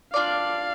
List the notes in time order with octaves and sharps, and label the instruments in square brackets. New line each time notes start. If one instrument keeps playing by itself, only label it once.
[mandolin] D4 F4 G#4 D5 [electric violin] F5